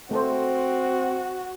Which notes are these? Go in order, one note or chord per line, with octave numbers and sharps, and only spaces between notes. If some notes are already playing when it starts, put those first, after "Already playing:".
A3 C4 F#4 A4 C5